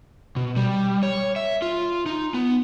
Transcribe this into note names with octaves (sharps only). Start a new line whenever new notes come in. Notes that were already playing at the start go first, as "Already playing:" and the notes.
B2
G3
C#5
E5
F4
D#4
B3